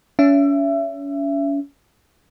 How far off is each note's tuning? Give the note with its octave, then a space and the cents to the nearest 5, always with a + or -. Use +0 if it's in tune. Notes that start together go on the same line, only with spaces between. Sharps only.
C#4 +35 E5 +25